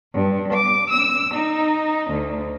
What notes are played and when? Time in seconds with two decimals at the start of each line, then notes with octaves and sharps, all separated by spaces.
0.13 G2
0.52 D6
0.90 E6
1.34 D#4
2.10 D2